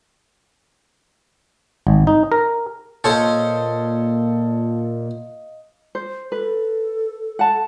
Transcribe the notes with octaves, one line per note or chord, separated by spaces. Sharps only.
G#1
D#4
A#4
A#2 F4 A4 C5 C#5 D#5 F5 D#6
C5
A4 B4
F#5 A5